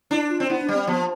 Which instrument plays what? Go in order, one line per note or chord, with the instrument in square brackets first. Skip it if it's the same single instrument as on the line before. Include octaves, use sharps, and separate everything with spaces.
[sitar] D4 [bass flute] E4
[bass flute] F4
[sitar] C4
[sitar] B3 [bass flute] E4
[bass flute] D4
[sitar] G3
[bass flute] C4
[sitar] F3 [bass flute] B3